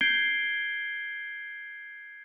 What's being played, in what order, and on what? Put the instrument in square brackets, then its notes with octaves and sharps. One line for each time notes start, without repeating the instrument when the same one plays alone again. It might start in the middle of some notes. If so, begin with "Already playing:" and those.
[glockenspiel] G6 G#6 C7 D7 G7